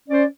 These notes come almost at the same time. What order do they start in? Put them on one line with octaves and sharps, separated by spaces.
C#4 D5 C5